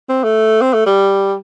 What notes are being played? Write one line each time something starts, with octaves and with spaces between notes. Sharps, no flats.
C4
A3
C4
A3
G3